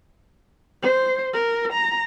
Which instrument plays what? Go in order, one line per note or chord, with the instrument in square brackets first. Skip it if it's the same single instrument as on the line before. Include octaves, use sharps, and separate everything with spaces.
[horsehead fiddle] C5
A#4
A#5